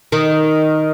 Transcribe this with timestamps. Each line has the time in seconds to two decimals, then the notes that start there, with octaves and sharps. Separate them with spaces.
0.12 D#3